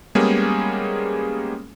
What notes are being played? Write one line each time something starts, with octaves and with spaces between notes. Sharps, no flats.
G3 G#3 A#3 B3 C#4 G#4